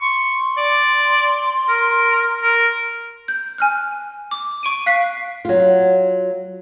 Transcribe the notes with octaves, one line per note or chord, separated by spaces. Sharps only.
C6 C#6
D5
A#4
A#4
G6
G#5 F6 F#6
D6
C#6 D7 D#7
F5 F#6 B6 C7
F#3 F4